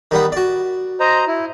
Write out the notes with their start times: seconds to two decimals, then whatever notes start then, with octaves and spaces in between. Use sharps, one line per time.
0.11 D#3 G3 B3
0.32 F#4 D5
1.00 C5 D#5 A#5
1.27 E4